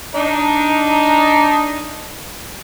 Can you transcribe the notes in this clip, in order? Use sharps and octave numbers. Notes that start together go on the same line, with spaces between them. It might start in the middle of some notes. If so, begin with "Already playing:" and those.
D4 D#4